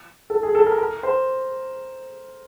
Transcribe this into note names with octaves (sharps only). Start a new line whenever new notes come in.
A4
G#4
A4
A#4
A#4
C5